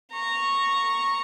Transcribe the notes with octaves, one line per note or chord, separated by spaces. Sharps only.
A#5 C#6